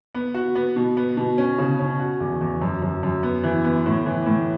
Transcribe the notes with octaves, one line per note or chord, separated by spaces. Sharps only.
B3
F#4
B3
B2
B3
B2
C#4
C#3
C#4
F#4
E2
E2
F#2
F#2
F#2
B3
E3
B3
A2
E3
A2